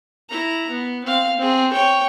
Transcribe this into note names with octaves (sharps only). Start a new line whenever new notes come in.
E4 A#5
B3
C4 F5
C4 G#4
C#5 G5